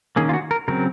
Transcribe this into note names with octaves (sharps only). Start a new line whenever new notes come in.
D#3 A#3 C#4 G#4
F4
F#4
A#4
C#3 F#3 C4 A#4